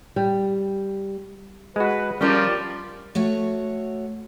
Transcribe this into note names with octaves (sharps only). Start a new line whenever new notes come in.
G3
G#3 F#4 B4
F3 G3 C#4 G4 A#4 D5
A3 F#4 C#5 F#5